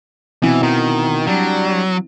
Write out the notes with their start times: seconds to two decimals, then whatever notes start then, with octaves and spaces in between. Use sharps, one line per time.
0.43 B2 E3 C4 E4
0.63 D#3
1.27 F#3 G3 D4